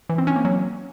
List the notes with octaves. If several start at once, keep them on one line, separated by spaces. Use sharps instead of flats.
E3
C4
C#4
A#3
F#3